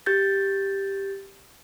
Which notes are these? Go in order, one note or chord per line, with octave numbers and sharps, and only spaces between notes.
G4 G6 A6